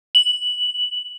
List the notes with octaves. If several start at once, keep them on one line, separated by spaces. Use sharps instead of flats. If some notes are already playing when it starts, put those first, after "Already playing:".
F#7